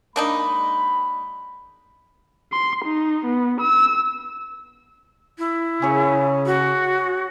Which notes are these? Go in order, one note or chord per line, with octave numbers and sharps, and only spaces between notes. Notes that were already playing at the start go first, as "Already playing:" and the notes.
G#3 A#3 D4 D#4 B5
C6
D#4
B3
E6
E4
C#3 G#4 C#5
F#4